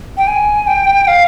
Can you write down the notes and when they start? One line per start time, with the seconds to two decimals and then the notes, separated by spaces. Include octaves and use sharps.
0.17 G5
0.28 G#5
0.67 G5
1.08 F5